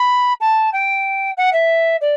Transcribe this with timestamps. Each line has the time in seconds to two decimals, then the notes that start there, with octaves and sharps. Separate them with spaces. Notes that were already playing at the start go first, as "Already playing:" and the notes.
Already playing: B5
0.40 A5
0.72 G5
1.37 F#5
1.53 E5
2.01 D5